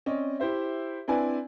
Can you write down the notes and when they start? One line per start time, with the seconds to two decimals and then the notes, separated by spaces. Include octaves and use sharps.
0.06 C4 C#4 D5 D#5
0.40 E4 G4 C5 E5
1.08 C4 D4 E4 B4 D5 G#5